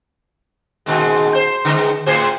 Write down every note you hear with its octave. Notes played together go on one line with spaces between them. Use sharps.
A#2 D#3 G#3
C5
D3 G#3
A2 G#4 C5